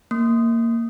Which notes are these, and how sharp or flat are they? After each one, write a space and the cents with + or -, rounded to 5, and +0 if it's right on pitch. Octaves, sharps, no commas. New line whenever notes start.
A#3 -15